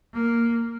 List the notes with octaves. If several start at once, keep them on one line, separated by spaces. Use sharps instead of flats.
A#3